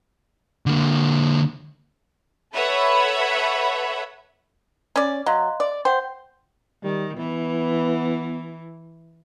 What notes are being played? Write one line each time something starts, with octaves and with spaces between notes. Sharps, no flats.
D3 A#3
A4 B4 C#5 E5 F#5 B5
C#4 D5
F#3 D#5 F5 C6
D5
C5 F#5 G5
D#3 G3
E3 B3